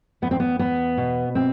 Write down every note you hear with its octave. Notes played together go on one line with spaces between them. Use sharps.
E2 B3
C4
B3
E2 B3
B2
C4